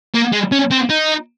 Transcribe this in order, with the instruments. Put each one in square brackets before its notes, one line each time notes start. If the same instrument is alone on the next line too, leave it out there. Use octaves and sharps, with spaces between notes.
[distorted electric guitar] A#3
G#3
C#4
C4
D#4